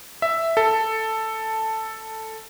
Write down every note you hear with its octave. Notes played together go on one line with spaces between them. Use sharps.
E5
A4